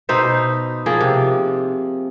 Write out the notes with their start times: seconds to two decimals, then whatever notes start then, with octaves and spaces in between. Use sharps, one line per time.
0.09 B2 D#4 C5 E5
0.86 F3 A#3 G#4
1.01 C3